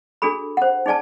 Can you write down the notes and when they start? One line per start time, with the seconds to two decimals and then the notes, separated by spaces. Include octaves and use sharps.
0.22 D4 F#4 G#4 A4 B5
0.57 C5 F#5
0.86 D#4 G#4 D5 G#5 A5